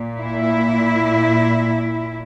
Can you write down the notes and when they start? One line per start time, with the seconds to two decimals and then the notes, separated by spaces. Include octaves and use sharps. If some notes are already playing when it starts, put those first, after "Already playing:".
Already playing: A#2
0.19 E4